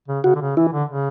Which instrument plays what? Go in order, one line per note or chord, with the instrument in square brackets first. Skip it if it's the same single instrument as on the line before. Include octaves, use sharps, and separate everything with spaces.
[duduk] C#3
[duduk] C#3 [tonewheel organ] F#4
[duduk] D3
C#3
[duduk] E3 [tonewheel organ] E4
[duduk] D3
C#3